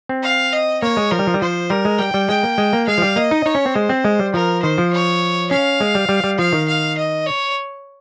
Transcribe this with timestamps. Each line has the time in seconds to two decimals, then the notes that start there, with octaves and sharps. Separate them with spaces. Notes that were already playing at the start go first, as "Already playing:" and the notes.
0.09 C4
0.23 F5
0.53 D#5
0.82 A#3 C#5
0.97 G#3
1.11 F3 A#4
1.19 G3
1.27 F3
1.34 G3
1.41 F3 C5
1.70 G3 A#4
1.85 G#3
1.99 G3 G5
2.14 G3
2.29 G#3 G5
2.43 A#3
2.58 G#3
2.73 A#3
2.87 G#3 F5
2.98 F3
3.02 G3
3.16 A#3 D#5
3.31 D#4
3.46 D#4 C#5
3.55 C#4
3.66 C4
3.74 G#3 C5
3.89 C4
4.04 G#3
4.19 G3
4.34 F3 A#4
4.63 D#3 C5
4.78 F3
4.93 C#5
5.51 C#4 F5
5.80 G#3
5.95 G3
6.09 G3
6.24 G3
6.38 F3 F5
6.53 D#3
6.68 F5
6.97 D#5
7.26 C#5